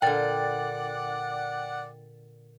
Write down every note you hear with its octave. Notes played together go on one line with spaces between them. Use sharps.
A#2 D3 D5 F#5 G5 A6